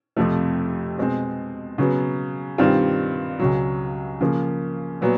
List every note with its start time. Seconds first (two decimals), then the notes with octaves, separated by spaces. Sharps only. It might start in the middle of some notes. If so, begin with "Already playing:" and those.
0.17 F2 C3 F3 A3
0.98 B2 G#3 C4
1.78 C#3 F#3 B3
2.58 G2 D#3 G3 C4 F4
3.39 C#2 C#3 F#3
4.20 C#3 F3 A#3
5.01 A#2 F#3 B3